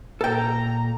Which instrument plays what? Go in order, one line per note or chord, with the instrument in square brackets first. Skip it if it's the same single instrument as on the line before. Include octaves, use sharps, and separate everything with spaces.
[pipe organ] A#2 A#3 [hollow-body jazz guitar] A4 G5 [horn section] A#5